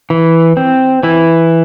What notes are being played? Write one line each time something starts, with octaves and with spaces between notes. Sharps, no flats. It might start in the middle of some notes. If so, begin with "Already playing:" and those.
E3
C4
E3 E4